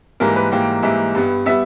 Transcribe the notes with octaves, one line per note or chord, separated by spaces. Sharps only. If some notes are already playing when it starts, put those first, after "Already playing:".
G#2 E3 G3 A#3 A#4
B4
G#2 E3 G3 A#3 G5
G#2 E3 G3 A#3 E5
G2 G3 B3
G3 B3 E5